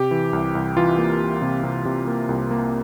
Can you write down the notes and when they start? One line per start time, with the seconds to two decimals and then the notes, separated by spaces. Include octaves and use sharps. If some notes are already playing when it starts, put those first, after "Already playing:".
Already playing: C3 G4
0.11 E3
0.33 C2
0.55 C2
0.77 E3 F4
0.98 A#3
1.20 E3
1.42 C3
1.64 C3
1.85 C3
2.07 A#3
2.29 C2
2.51 A#3